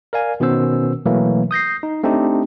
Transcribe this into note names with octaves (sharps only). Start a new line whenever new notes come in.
A#4 D5 F5 G#5
B2 D#3 B3 C#4 C5 E6
B2 E3 F#3 A3 A#3
D#6 G6 A#6 C7
D#4
A3 C4 D4 D#4 G4